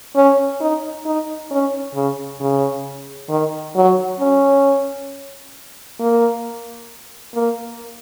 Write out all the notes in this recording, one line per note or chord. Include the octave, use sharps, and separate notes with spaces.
C#4
D#4
D#4
C#4
C#3
C#3
D#3
F#3
C#4
A#3
A#3